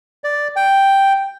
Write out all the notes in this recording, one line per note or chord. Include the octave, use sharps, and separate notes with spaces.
D5
G5